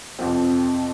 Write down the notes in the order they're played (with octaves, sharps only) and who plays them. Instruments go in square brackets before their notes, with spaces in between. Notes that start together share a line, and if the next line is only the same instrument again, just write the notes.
[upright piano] F2 C3 F3 C4